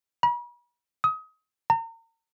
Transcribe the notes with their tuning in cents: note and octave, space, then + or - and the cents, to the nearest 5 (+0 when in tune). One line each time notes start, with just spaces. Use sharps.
B5 -45
D#6 +25
A#5 -40